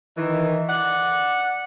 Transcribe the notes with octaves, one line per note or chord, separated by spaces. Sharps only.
D#3 E3
D5 F#5